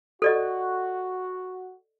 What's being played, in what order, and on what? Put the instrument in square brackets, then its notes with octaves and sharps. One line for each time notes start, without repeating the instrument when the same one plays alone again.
[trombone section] F#4 [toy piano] A4 D5 D#5